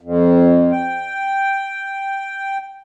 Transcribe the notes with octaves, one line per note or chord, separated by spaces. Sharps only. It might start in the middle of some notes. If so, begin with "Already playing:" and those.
F2
G5